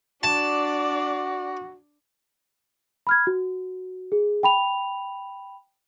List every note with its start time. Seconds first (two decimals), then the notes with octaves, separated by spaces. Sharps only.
0.23 D4 F#4 D5 A5
3.07 B5 F6 G#6
3.27 F#4
4.12 G#4
4.43 G5 B5 F7